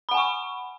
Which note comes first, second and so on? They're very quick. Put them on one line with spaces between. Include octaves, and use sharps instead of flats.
B5 F#5 G#5 C#6